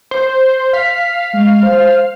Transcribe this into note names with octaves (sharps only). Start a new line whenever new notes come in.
C5
F5 B6
G#3
C5